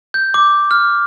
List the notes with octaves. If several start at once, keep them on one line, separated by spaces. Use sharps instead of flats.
G6
D6
F6